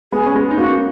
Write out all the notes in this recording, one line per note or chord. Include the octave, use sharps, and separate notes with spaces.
G#3 B3 G#4
C#4
G#3 B3
D#4
A#3 C#4 F#4